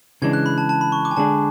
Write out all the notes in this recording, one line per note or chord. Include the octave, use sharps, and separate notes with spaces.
C#3 E3 G#3 D4 G#6
F#6
B5
A5
A5
B5
C#6
D6
G#5
D3 G#3 D4 G#4 A5